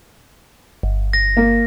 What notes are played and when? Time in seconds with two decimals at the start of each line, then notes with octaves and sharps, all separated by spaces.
0.83 G1
1.13 A#6
1.37 A#3